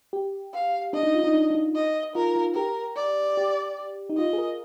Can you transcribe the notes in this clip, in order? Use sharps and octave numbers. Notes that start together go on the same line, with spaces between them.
G4
F5
D4 D#5
D#4
F4
D#4
D4
D4
D#4
D#5
F4 A#4
F4
G4 A#4
D5
G4
D#4
F4 D#5
G#4
A#4